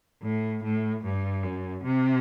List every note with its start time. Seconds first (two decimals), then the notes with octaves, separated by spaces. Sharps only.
0.23 A2
0.63 A2
1.04 G2
1.43 F#2
1.84 C3